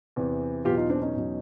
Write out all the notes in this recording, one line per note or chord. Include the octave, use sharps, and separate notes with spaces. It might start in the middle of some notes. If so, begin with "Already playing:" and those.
E2 C3 E3
E2 B2 F#3 F4 G4
D#4 F4
C4 D4
C#4 D#4
E2 B2 F#3